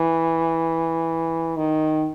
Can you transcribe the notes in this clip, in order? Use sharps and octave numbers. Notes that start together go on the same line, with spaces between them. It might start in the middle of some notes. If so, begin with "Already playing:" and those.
Already playing: E3
D#3